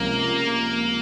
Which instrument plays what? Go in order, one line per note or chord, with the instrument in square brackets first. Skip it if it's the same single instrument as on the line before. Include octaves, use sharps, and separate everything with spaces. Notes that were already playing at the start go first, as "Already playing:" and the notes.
Already playing: [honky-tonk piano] C#2 C3 F3 G#3 C#4 [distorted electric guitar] A#3